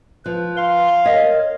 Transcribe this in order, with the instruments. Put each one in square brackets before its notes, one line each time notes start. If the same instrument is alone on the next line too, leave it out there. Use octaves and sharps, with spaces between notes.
[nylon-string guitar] F3 [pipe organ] B4
[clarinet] F5 [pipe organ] C6
[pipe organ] A#4 C#5 [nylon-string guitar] D#5